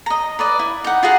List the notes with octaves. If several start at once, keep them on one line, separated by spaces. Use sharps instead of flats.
D#5 A#5
B4 D5 D#5
E4
D#4 F#5
F4 F#4 G#4 F#5